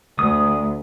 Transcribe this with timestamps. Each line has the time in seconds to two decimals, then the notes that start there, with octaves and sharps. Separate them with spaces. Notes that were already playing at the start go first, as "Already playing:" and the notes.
0.19 D2 D#6